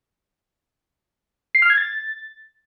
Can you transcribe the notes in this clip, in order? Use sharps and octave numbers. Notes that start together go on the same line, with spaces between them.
C7
F6
G#6
A6